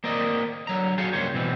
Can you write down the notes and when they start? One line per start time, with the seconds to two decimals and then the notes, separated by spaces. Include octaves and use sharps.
0.04 A#3 C4 A#4 D5 D#5
0.67 D3 F#3 A#5
0.98 F#4 G#4 A4 C#5 F5 G5
1.13 C#2 G2 A#3 C5 C#5
1.34 B2 E3 C4